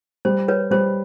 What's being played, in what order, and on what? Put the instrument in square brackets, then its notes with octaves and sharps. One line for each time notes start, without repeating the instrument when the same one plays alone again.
[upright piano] G3 [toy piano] C5
[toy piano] B4 C#5
[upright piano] G3 [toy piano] C5